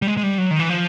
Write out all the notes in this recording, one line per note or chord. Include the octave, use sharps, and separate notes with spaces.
G3
G#3
G#3
G3
F#3
D#3
E3
F3